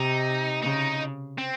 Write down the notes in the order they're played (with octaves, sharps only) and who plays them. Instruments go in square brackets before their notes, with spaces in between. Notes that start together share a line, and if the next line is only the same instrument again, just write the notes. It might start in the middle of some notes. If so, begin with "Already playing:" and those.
Already playing: [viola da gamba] C3 [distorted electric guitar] D#4
[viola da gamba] C#3 [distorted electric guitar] D#4
[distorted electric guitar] C4